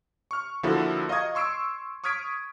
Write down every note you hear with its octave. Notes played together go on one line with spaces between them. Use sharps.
C#6 F6
D3 F3 A#3 E4 F#4 A4
D#5 F5 A#5 C#6 D#6 G#6
C6 C#6 E6 C7 D7
C#6 D#6 F6 G#6 B6 D7